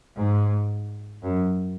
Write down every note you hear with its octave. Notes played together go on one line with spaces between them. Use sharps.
G#2
F#2